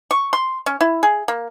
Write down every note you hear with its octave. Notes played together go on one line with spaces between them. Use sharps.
C#6
C6
C#4
E4
G#4
A#3